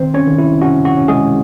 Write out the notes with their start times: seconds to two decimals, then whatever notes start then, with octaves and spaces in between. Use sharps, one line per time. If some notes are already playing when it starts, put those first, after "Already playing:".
Already playing: D#3 C4 C5
0.14 C#4 C#5
0.27 D#3
0.39 E4
0.62 C#4 F#4
0.85 F#4
0.97 C#4
1.08 G#3 G#4